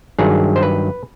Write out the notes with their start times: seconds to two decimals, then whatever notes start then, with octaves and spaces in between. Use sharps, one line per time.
0.19 G2 D#3 F#3 G#4
0.56 C5
0.63 B4